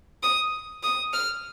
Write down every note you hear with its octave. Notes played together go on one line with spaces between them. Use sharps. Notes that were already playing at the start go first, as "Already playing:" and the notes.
D#6
D#6
F6